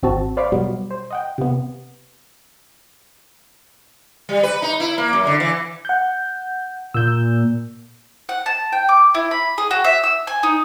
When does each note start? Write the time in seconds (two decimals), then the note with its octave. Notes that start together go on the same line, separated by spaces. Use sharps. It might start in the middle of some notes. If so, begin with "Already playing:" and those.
0.03 G#1 C4 F#4 A5
0.37 C5 D5 F5 B5 C#6 D6
0.52 B2 F#3 G3 B3
0.91 C5
1.10 D#5 F#5 G5
1.38 C3 B3
4.29 G3
4.43 B4
4.62 D#4
4.80 E4
4.98 A#3
5.13 F#2
5.27 D3
5.40 E3
5.85 F#5 G6
6.94 A#2 E6 G6
8.29 F#5
8.46 A5
8.72 G5
8.89 D6
9.15 E4
9.31 B5
9.58 G#4
9.71 F#4
9.84 E5
10.04 E6
10.27 G#5
10.43 D#4